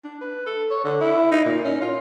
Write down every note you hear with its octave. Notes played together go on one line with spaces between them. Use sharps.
D4
B4
A4
C#5
D3
E4
D#4
A#2
C#4
F4